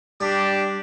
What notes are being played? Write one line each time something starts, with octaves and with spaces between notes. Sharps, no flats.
G3 D4 G4 D6